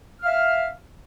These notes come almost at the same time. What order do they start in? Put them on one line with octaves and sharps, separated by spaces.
F6 F5 E5